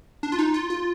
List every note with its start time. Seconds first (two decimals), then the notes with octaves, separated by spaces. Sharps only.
0.23 D4
0.32 F4
0.39 D#4
0.54 F4
0.70 F4